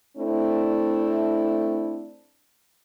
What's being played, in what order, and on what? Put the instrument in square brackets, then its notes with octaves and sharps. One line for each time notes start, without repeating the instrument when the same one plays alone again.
[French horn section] A3 C4 D4 E4